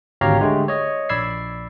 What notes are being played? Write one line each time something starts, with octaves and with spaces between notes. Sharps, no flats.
G#1 D2 G4 C#5 F5 A#5
D3 G#3 A3 G4
C#5 D#5
A#1 D5 B5 E6 G#6 C7